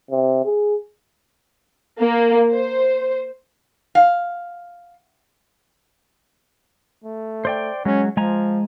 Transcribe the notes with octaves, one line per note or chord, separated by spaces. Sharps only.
C3
G#4
A#3
C5
F5
A3
C5 D5 G5
F#3 G#3 C#4
F3 G#3 G#5 A#5